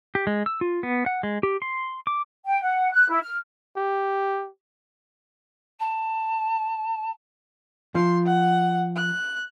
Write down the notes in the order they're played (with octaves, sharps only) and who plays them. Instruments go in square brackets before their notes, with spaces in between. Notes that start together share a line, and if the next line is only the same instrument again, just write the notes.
[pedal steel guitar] G4
G#3
E6
F4
B3
F#5
G#3
G4
C6
D6
[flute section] G5
F#5
F#6
E4
F6
[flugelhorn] G4
[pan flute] A5
[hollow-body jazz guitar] F3 [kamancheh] C6
[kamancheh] F#5
F#6